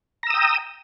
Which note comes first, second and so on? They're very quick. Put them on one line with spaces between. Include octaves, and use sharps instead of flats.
A#5 E6 D#6 G5